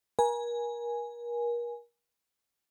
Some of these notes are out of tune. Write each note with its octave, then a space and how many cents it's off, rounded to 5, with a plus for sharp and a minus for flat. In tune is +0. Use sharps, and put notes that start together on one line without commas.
A#4 +35 G#5 +0